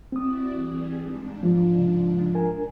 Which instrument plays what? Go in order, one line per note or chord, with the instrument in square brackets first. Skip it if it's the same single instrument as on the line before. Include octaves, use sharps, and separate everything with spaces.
[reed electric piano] C4 D#6 [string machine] E4 F#4 D5
[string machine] E3 G3 G#4
G#2 D4
[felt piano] F3
[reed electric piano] C#3
D4 A#4 G#5